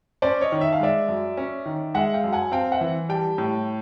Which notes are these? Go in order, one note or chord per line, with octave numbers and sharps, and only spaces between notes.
C#4 C5 D5
C#5 D#5
D#3
E5
F5
G#3 D5 E5
F#2
C#4
D#3
G#3 E5 F#5
F5 G5
F#2
F#5 G#5
C4 F5 G5
E5 F#5
E3
G3 G5 A5
A2